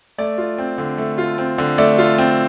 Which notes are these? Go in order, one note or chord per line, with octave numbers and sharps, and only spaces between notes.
A3 D5
F4
C4
D3
A3
F4
C4
D3
A3 D5
F4
C4